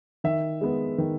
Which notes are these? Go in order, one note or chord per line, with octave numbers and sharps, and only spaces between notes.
D#3 E5
G#3 B3
D#3